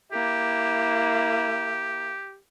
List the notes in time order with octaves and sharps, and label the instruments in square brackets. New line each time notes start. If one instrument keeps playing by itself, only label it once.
[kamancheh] A#3 E4 [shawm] G4